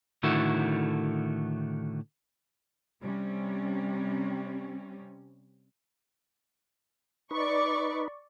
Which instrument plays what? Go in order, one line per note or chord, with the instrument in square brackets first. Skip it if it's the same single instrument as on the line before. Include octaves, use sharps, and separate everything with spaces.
[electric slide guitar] A2 D3 D#3 A3 E4 F#4
[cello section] C3 G3 C4 C#4
[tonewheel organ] D#4 B4 [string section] D5 C#6